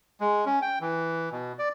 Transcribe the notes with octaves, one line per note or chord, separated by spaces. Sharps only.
G#3
C#4
G5
E3
B2
D5